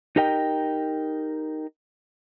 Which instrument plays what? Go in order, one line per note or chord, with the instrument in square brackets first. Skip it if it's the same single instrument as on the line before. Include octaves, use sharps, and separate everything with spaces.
[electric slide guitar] D#4 G4 A#4 D#5 G5